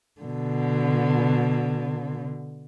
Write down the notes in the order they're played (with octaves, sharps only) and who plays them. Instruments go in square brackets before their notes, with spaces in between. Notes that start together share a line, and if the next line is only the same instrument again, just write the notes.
[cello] B2 D3